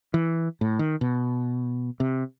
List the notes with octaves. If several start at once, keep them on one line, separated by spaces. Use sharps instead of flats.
E3
A2
D#3
B2
C3